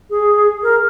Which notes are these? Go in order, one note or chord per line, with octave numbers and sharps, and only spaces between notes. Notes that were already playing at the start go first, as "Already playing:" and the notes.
G#4
A#4